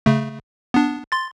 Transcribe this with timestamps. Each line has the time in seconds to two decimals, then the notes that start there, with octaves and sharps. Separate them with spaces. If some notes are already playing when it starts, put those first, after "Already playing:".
0.06 C#3 A3
0.74 B3 D4
1.12 C6 A6